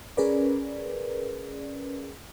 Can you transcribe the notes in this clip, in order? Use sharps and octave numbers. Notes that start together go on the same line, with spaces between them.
C#4 G#4 A#4 B4 D5